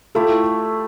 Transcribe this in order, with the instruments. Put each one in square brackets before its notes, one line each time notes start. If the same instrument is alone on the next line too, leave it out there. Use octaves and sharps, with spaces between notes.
[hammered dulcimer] A3 E4 G4 [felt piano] F4 A4